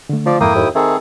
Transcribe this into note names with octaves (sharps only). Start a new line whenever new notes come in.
D3 A3
F3 D5
F2 G#2 A#3 E4 A4 G5 D#6
D#2
D#3 C4 G#4 A4 E5